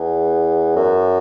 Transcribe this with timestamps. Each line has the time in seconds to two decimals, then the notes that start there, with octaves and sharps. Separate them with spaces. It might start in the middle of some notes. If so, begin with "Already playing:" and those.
Already playing: E2
0.76 F#2